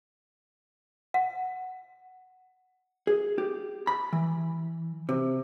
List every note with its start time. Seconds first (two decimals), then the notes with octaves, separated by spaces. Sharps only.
1.14 F#5
3.07 G#4
3.38 G4
3.87 B5
4.13 E3
5.09 C3